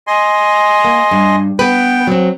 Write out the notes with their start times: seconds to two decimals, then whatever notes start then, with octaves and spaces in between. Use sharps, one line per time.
0.07 D#5 G#5 C6
0.85 A#3
1.11 G2
1.59 B3 B4 G5
2.07 F#3 C4